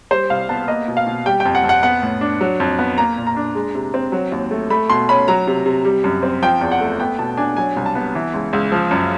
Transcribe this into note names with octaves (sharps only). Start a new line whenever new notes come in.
G3 C5
C2 F5
B3 A5
A#3 D#5
B2
F5
B2
G3 G5
F2 G5
F#5
F2
F#5
B3 F#5
A2
D4
F#3
F2
B3
A#3 A#5
A#2
A#5
D4
G#3
C3
C4
F#3
D#2
A3
A3 B5
B2 C6
C#4 B5
F#3 A#5
C3
C3
G3
F#2
C4
F3 G5
E2
F#5
A3
B3 G5
B2 A5
D4 G#5
F#3 G#5
C2
A5
B3
E3
C#2
C#2
F3
F#2